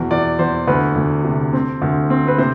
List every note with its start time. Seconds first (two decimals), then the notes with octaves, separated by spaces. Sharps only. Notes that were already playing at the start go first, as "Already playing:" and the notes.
Already playing: E2 B2
0.10 E2 D5
0.39 E2 C5
0.67 D2 B4
0.96 D2
1.24 C3
1.53 C4
1.82 D2
2.10 C4
2.28 B4
2.38 C3 C5